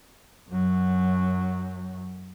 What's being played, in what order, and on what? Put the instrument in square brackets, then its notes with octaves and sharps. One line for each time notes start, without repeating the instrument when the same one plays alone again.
[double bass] F#2 F#3